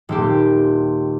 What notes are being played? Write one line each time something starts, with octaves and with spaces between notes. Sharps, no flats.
D#1 C4 G4